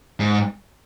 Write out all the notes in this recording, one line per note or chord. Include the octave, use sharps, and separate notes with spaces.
G#2